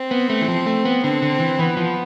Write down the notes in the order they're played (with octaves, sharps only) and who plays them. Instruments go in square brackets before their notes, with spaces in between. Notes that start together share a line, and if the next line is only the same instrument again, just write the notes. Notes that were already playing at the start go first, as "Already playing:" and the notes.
Already playing: [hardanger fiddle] C4
[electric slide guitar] B3
A3
E3
F3
A3
B3
[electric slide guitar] D3 [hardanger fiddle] C4
[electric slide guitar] D3
E3
[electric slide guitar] E3 [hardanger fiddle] B3
[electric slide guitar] F3